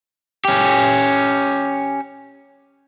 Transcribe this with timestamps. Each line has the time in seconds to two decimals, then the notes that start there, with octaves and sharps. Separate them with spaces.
0.45 C#4 G4